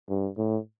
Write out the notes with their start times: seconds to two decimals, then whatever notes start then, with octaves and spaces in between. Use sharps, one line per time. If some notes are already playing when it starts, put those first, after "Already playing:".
0.09 G2
0.38 A2